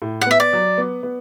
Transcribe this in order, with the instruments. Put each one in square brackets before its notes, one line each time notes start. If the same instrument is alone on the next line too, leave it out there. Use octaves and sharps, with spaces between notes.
[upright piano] A2
[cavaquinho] F#5
[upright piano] B3 [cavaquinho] E5
[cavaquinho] D5
[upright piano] F#3
B3
B3